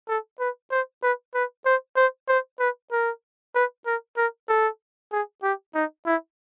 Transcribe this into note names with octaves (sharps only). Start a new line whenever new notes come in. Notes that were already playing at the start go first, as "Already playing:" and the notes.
A4
B4
C5
B4
B4
C5
C5
C5
B4
A#4
B4
A#4
A#4
A4
G#4
G4
D#4
E4